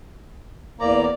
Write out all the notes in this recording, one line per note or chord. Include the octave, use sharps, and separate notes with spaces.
E2 A#3 D5 A#5